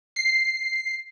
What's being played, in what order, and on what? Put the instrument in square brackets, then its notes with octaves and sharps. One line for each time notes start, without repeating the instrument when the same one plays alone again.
[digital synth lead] C7